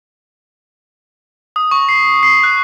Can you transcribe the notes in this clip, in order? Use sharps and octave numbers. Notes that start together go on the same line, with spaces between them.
D#6
C#6
C7
C7
F#6